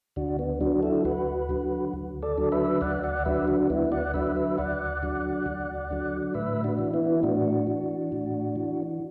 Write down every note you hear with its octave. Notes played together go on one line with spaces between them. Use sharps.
D2 D4 F#4
B3
D3 F#3 D4 F#4
E4 A4
D2 F#4 B4
D3 F#3
D2
A4 D5
D3 F#3
B4 E5
D2 D5 F#5
D5 F#5
D3 F#3 B4 E5
D4 F#4
D2 B3 E4
D5 F#5
D3 F#3 B4 E5
B4 E5
D2 D5 F#5
D3 F#3
D2
D3 F#3
A2 B4 E5
D4 F#4
E3
B3 E4
A2 D4 F#4
E3
A2
E3